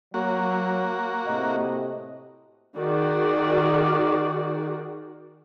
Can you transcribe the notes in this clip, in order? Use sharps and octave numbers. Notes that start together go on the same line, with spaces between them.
F#3 A#3 F#4
A2 C3 D#5
D#3 F#4 G#4 D5